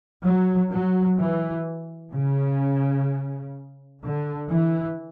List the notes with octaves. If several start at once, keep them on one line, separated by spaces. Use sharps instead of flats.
F#3
F#3
E3
C#3
D3
E3